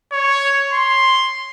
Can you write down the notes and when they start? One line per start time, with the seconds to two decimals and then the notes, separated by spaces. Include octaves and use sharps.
0.12 C#5
0.73 C6